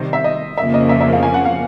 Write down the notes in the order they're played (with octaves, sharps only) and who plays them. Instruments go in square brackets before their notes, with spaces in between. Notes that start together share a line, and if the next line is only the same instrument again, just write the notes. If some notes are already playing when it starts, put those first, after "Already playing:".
Already playing: [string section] C3 D#3 G3 [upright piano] C5
[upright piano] E5
D#5
[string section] F2 C#3 F3 A#3 [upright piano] E5
[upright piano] D#5
E5
E5
F5
G#5
F#5
F5